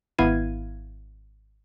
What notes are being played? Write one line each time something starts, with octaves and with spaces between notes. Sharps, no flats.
G#1 B3 E4 F5 G#6 D#7